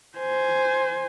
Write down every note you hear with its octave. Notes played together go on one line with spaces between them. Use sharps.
C5 G#5